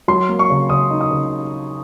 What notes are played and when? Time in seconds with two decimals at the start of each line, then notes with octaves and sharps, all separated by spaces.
0.08 F#3 C6
0.29 A#3
0.39 C#6
0.50 C#3
0.69 C#3 D#6
0.90 D#4
1.01 D#6
1.11 C#3